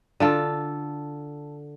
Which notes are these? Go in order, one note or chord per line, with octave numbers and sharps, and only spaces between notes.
D3 F4 A4